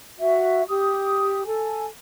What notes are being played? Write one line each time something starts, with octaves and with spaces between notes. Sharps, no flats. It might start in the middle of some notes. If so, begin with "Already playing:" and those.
F#4 E5
G4 D#6
A4 G#5